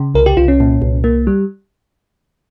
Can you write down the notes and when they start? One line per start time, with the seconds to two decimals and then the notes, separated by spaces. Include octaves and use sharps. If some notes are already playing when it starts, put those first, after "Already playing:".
Already playing: C#3
0.14 C2 A#4
0.26 G4
0.37 C2 F4
0.48 C#4
0.60 A#2
0.82 C2
1.04 A#3
1.27 G3